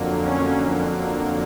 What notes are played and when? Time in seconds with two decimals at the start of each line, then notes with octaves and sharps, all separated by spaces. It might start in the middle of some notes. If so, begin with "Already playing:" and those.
Already playing: F2 D3 F#3 A#3
0.26 C#4